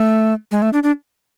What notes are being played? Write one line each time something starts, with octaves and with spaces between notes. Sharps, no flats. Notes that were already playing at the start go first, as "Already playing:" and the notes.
Already playing: A3
G#3
A3
D4
D4